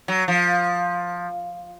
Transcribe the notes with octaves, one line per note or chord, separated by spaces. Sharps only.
F#3
F3